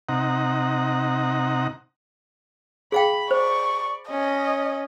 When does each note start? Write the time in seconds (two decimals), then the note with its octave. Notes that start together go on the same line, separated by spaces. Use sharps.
0.09 C3 D#4 F#5 A#5
2.92 G#4 F5 G5 B5
3.31 C5 D5 C#6
4.10 C#4 D#5